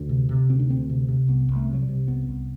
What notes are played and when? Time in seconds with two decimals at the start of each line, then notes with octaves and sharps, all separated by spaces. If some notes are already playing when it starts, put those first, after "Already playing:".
Already playing: D2 D4
0.09 C3
0.29 C3
0.49 D2 C4
0.59 D4
0.69 D2 C4
0.90 C3
1.08 C3
1.28 C2 B3
1.49 C2
1.56 A3
1.69 C3 F#3
1.82 G3
1.89 C3
2.08 C2 B3
2.28 C2